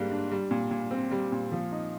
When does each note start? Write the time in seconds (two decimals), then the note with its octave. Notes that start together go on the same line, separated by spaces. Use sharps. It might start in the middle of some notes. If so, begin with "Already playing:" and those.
Already playing: G#2 G3 A#3 D4
0.11 D4
0.31 G3
0.51 A#2
0.71 A#2
0.91 C4
1.11 G3
1.32 A#2
1.52 F3
1.72 D#4